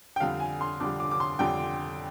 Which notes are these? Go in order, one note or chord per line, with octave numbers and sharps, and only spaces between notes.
G5
F2 D3 G3 F5
G#5
C6
F2 D3 G3 D6
D6
D6
C6
F2 D3 G3 G5